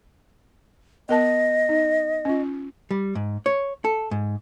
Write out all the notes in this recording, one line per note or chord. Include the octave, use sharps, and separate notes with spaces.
B3 A#4 D#5 A5
D#4
C#4 F4
G3
G#2
C#5
A4
G#2